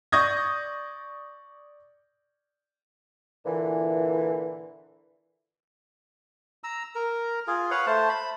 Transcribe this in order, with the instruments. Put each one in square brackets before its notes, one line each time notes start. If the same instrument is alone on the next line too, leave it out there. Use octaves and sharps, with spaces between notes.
[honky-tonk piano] D5 C#6 D#6 G6 G#6 A#6
[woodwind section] A#2 D3 E3
[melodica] A#5 E6
A#4
F4 G#4
B4 C#5 F5 F#5
A3 C5 A5
B5